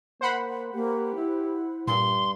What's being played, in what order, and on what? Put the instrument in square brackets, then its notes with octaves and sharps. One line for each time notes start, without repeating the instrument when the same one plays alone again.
[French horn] A#3 [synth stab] C5 F#5 B5
[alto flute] A#3 [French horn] G4
[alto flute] E4
[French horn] G2 [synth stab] A#2 [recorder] C6